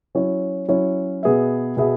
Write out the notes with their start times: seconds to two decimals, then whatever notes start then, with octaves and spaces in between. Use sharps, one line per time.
0.15 F#3 C#4 E4 C#5
0.69 F#3 C#4 E4 C#5
1.23 B2 B3 G#4 B4 E5
1.77 B2 B3 G#4 B4 E5